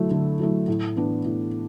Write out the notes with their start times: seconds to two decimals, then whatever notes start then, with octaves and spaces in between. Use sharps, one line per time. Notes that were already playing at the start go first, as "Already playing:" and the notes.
Already playing: D3 F#3 A3 E4
0.11 D3
0.39 F#3 A3 E4
0.68 A2
0.96 E3 B3 D4
1.25 A2